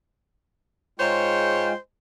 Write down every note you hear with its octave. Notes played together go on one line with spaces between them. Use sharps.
G#2 G#3 F4 C5 C#5 G5